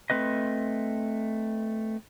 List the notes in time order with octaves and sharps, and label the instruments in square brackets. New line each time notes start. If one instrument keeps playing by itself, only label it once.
[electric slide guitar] A3 C4 B4 D#5